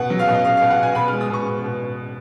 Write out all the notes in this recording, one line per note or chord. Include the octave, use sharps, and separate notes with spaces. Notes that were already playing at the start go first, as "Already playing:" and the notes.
Already playing: B2 F#5
F#3
F5
B2 D#5
B2 F5
B2 F5
F#5
B2 G#5
B2 B5
G#3 F6
D#6
B2 C#6
B2
B2